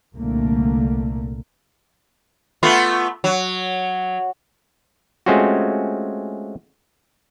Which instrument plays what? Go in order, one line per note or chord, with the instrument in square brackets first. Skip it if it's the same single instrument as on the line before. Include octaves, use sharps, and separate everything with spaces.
[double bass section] C2 A#2 D3 A3 A#3
[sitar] A3 B3 F4
F#3
[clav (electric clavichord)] G#3 A3 C4 C#4 F4 F#4